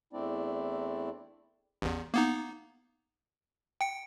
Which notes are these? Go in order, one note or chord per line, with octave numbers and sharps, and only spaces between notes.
E2 A3 C4 D4 E4 D5
A1 E2
A#3 B3 D#4
G5 C#7